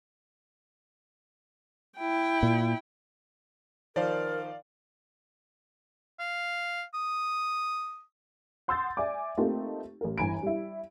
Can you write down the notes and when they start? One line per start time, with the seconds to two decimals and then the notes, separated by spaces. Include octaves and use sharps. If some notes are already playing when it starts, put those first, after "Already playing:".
1.98 E4 G5
2.43 A#2
3.96 D#3 F3 A#4 C5 D5 F5
6.19 F5
6.94 D#6
8.68 F#5 C6 D#6 E6 G6 A6
8.97 D5 E5 G#5 D6
9.38 A3 A#3 C4 D#4 F4 G4
10.01 A1 A#4
10.18 G1 E3 G#5 A#5 B5 D7
10.42 G3 E4